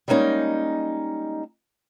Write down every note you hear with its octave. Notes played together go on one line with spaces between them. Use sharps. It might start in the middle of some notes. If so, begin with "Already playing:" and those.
G3 G#3 A#3 C#4 D#4